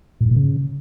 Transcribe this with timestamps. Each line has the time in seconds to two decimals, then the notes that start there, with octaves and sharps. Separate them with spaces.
0.21 A2
0.26 G#2
0.31 A#2
0.36 C#3